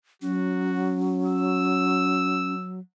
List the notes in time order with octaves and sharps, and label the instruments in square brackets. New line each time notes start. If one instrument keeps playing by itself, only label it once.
[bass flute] F#3 [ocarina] C#4 [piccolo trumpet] F#4
[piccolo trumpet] E6